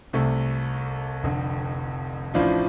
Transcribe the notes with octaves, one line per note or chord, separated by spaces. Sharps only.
C2 C3 A3
F1 F2 D3
A1 A2 F3 D4 F4